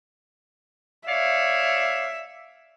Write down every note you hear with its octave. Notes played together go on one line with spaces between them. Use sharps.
C#5 D5 E5 F5